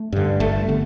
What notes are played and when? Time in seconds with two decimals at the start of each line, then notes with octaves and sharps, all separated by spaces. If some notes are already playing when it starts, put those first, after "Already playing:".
Already playing: A3
0.12 G2 D3
0.40 G1 A3
0.69 D3 B3